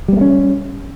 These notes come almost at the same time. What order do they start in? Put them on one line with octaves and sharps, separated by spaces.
G3 B3 A3 C#4